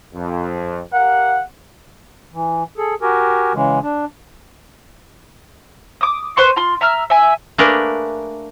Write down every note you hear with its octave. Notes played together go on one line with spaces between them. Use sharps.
F2
G4 A#4 F5 F#5
E3
G#4 A4
F#4 G4 A#4 G#5
C#3 E3 G#3
D4
D6 D#6
B4 C5 C6 C#6
F4 C6
E5 A#5 E6 F6
E5 G#5
A3 A#3 D4 G#4 A#4 B4